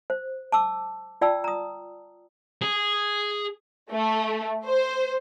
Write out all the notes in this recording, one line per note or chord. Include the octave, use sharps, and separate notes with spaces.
C5
A5 D6 E6
F4 D5 G5 A5 E6
A#5 D#6
G#4
A3
C5